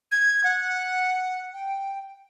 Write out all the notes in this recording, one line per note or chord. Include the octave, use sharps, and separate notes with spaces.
G#6
F#5
G5